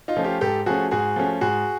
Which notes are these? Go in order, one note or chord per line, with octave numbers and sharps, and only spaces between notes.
D#4 F4
F3 A3 C#4
F4 G4
G#2 G4 A4
F3 A3 C#4 F#4 G#4
G#2 F#4 G#4
F3 A3 C#4
G#2 F#4 G#4